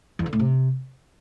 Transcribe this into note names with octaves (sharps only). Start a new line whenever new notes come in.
E2
D3
A2
C3